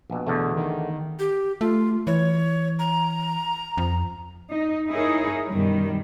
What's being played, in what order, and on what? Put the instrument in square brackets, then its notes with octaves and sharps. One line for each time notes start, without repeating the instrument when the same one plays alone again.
[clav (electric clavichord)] A#1 B2
[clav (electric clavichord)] E2 D3 A3 [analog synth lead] B2
[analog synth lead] D#3
[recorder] G4
[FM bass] A3 [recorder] F4
[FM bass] E3 [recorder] C#5
[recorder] A#5
[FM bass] F2
[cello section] D#4
D#4 E4 G#4 A#4 C#5
F#2 B2 D#3 G3